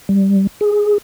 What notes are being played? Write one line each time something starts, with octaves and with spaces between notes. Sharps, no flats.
G3
G#4